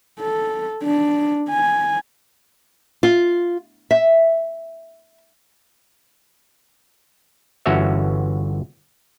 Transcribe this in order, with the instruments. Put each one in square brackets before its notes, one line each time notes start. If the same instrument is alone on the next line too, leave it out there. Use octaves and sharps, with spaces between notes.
[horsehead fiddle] A4
D4
G#5
[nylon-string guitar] F4
E5
[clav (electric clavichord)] G1 E3 C#4 F#4 C#5 E5